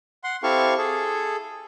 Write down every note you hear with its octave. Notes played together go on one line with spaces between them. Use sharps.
F#5 C6
C4 E4 G4 A4 F5 C#6
G#4 A4